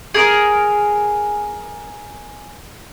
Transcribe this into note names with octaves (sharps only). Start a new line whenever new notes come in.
G#4 A#4